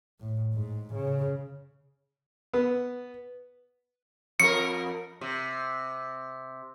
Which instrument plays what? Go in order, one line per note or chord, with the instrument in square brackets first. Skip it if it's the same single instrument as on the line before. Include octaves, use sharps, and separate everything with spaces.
[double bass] A2
G#2
C#3
[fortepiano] B3
[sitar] F2 A#4 [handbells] C#7
[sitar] C3